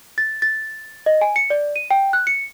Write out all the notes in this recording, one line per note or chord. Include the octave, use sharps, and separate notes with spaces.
A6
A6
D#5
G#5
C#7
D5
D#7
G5
F#6
C#7